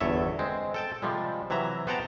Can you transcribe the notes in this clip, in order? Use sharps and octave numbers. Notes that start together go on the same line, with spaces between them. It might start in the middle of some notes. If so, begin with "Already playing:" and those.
G1 E2 A4 C#5 E5
G#3 C4
A4 G5 A5
C3 F3 G3 G#3
C3 E3 F#3 E5 A#5
B3 C5 F#5 G5 A5 A#5